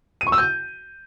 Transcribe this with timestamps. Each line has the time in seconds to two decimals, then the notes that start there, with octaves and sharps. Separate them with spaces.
0.21 D#7
0.27 C#6
0.32 E6
0.38 G6